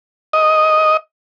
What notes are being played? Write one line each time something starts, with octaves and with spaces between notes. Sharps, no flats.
D#5